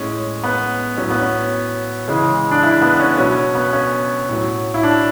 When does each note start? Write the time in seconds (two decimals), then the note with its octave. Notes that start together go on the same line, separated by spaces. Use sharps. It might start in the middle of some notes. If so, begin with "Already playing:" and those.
Already playing: A2 G#3 C#4
0.43 B3
0.97 A2 F#3 C#4
1.10 B3
1.22 C#4
2.08 C#3 E3 G#3
2.51 D4
2.63 E4
2.82 B3
2.99 C#4
3.18 B2 F#3 C#4
3.55 B3
3.73 C#4
4.29 A2 F#3
4.74 E4
4.83 D4